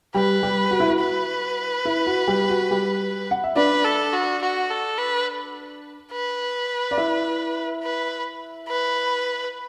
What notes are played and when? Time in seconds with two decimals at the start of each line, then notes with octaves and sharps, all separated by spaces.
0.14 G3 G4 B4
0.43 G3 G4
0.71 F#4
0.80 E4
0.88 F#4
1.00 B4
1.85 E4
2.07 F#4
2.28 G3 G4
2.43 G4
2.49 F#4
2.71 G3 G4
3.31 F#5
3.44 E5
3.56 D4 B4 D5
3.84 A4
4.13 F#4
4.41 F#4
4.70 A4
4.98 B4
6.12 B4
6.91 D5
6.97 E4 E5
7.83 B4
8.68 B4